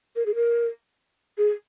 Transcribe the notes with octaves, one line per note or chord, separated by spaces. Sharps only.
A#4
G#4
A#4
G#4